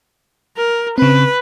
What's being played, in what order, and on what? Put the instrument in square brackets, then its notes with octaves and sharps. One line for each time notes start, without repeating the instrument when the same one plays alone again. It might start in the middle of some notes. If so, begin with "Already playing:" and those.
[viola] A#4
[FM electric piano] C#3 C4 [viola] B4